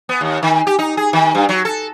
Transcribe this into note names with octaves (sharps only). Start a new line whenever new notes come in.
B3
D#2
D#3
G4
D#4
G#4
D#3
G2
F#3
A4